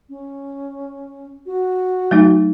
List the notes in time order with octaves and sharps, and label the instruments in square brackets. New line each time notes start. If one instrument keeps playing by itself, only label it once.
[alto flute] C#4
F#4
[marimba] F#3 A3 D#4